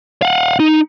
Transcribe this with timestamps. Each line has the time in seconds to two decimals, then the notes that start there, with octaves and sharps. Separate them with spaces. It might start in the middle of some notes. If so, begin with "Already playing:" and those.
0.22 F5 F#5
0.60 D#4